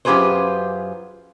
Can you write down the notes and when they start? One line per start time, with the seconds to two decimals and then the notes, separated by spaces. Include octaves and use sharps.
0.05 F#2 F4 G4 G#4 B4 C5